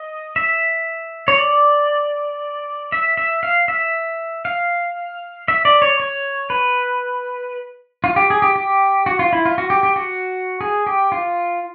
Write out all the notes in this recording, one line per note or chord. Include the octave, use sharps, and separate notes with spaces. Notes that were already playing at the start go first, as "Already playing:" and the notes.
Already playing: D#5
E5
C#5
D5
E5
E5
F5
E5
F5
E5
D5
C#5
C#5
B4
F4
G4
G#4
G4
G4
F#4
F4
E4
F4
F#4
G4
G4
F#4
G#4
G4
F4